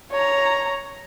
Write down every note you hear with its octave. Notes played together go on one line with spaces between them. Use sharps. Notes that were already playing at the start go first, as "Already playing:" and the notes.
C#5 A#5